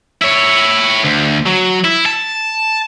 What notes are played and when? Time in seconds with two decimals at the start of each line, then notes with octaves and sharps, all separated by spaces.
0.22 E4 C#5
1.05 D2
1.46 F#3
1.85 E4
2.06 A5